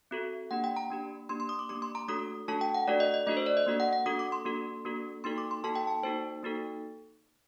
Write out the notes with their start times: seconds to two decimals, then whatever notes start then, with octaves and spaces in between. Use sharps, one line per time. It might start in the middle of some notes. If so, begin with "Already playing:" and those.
0.11 C4 F#4 A4
0.51 A#3 D4 G4 F#5
0.64 G5
0.76 A#5
0.90 A#3 D4 G4
1.29 A#3 D4 G4 C6
1.40 C6
1.49 D#6
1.59 D6
1.69 A#3 D4 G4 D6
1.82 C6
1.95 A#5
2.08 A3 D4 F#4 A4 D#6
2.48 A3 D4 F#4 A4 A5
2.61 G5
2.74 F#5
2.88 A3 D4 F#4 A4 D5
3.00 D#5
3.14 D#5
3.27 A3 D4 F#4 A4 D#5
3.37 C5
3.46 D5
3.57 D#5
3.66 A#3 D4 F#4 A4
3.80 F#5
3.93 F#5
4.06 A#3 D4 F#4 A4 D#6
4.19 D6
4.32 C6
4.45 A#3 D4 F#4 A4
4.85 A#3 D4 F#4 A4
5.24 A#3 D#4 F#4 A4 C6
5.38 D6
5.51 C6
5.64 A#3 D#4 F#4 A4 A5
5.75 G5
5.87 A5
6.03 A#3 D#4 F#4 A4 C5
6.43 A#3 D#4 F#4 A4